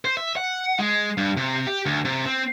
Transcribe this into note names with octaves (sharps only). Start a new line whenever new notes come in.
C5
E5
F#5
G#3
G2
C3
G4
D2
C3
C4